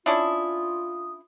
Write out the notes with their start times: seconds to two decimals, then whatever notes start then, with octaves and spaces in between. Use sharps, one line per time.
0.06 C#4 D4 E4 F4 D#6